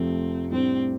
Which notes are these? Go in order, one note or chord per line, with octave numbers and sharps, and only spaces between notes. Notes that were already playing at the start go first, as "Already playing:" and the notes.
Already playing: F1 F2 F3 A3 C4
A2 G3 C4 D4 G4 C5